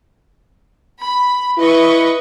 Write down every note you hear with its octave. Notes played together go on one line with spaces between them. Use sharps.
B5
E4 B4 D#5 C#6